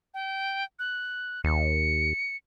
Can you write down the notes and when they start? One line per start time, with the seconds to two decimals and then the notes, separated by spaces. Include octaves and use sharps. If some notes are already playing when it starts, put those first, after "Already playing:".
0.14 G5
0.79 F#6
1.44 D#2 C#7